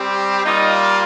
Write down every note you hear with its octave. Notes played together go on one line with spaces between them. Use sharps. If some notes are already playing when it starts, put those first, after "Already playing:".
Already playing: G3 C4 G4
G3 A#3 D#4 F4 D#5